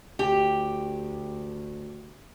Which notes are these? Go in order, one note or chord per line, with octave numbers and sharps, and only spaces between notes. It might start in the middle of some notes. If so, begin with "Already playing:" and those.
D2 G4